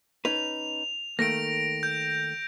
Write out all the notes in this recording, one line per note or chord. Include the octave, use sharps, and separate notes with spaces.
C#4 D#4 B4 F7
D#3 A3 A#3 A#6 D7
G6